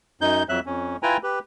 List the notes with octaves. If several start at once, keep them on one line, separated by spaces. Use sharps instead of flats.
F#2 D#4 G6
F2 F#3 E5 F#6
F2 C#4
E4 F4 B4 G5 G#5 A#5
G4 B4